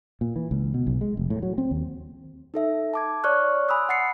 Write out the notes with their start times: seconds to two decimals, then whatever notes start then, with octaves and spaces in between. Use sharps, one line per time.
0.21 A#2
0.36 E3
0.51 C#2
0.74 B2
0.87 B1
1.01 G#3
1.17 F1
1.30 A2
1.42 F#3
1.58 C4
1.71 D#2
2.54 D#4 A4 E5
2.94 A5 D6 G#6
3.24 C#5 D5 C#6 F6 F#6
3.69 G#5 B5 C6 D#6 E6 F#6
3.89 F#5 A6 C7 C#7